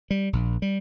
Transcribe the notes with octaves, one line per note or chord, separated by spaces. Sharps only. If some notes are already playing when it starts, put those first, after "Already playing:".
G3
A#1
G3